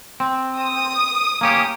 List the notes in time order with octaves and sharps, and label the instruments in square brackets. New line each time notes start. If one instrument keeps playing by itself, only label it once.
[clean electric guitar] C4
[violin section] D#6
[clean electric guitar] A#3 C#4 G4